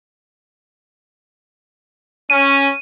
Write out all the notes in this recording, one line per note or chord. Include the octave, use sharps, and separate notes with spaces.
C#4 D#7